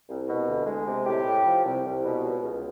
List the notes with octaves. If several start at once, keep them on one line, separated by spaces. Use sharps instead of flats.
C2
B2
D2
G#3
C3
A2 G4
A2
F3
C2
C2
B2
C#2
C#2